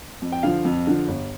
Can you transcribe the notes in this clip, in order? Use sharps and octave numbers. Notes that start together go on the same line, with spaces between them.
F2
G5
D3 F3 F5
F2
D3 F3
G1